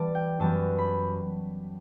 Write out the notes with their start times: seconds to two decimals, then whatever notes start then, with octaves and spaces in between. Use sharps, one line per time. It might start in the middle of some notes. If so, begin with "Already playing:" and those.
Already playing: E3 G3 B3 D5 A5
0.15 G5
0.40 F#2 E3 G3 B3 A5
0.78 B5